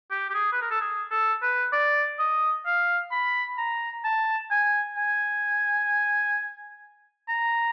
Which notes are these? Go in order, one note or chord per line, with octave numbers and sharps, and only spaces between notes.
G4
G4
G#4
B4
A#4
A4
G#4
A4
B4
D5
D#5
F5
B5
A#5
A5
G#5
G#5
A#5